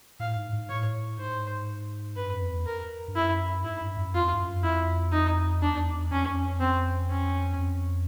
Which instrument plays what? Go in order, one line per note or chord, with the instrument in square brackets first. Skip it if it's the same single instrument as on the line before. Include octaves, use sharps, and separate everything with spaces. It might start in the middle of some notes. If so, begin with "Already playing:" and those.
[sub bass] A2 [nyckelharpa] F5
[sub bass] G#2
G#2
[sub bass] A2 [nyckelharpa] C#5
[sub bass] G#2 [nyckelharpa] C5
[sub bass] G2 [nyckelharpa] B4
[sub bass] F#2
F2
E2
[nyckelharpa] A#4
[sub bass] G2
[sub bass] F#2 [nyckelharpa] E4
[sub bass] G#2 [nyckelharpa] E4
[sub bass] G2
F#2
[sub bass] F2 [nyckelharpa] F4
[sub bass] G2
F#2
[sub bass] F2 [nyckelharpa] E4
[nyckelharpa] D#4
[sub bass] E2 [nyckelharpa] D4
[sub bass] F2 [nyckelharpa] C#4
[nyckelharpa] C4
C#4
[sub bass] F2